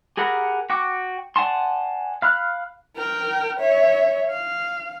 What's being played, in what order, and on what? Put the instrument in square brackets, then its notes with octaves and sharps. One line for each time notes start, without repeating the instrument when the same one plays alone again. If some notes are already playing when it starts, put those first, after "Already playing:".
[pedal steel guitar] G4 G#4 A#4 F#5 B5
F#4 G5 C#6 D6
D5 F#5 G#5 A5 C6
F5 B5 F6 F#6
[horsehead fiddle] A#4 G5
C#5 E5
F5